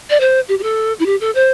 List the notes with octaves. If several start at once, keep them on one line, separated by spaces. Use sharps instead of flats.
D5
C5
G4
G4
A4
E4
G4
A4
C5